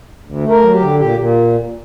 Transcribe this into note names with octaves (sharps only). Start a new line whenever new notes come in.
D2
A3
A#4
F#3
G4
D3
A#2 G4
A#2